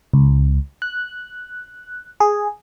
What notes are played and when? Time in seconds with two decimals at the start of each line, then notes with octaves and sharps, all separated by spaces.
0.14 C#2
0.82 F#6
2.20 G#4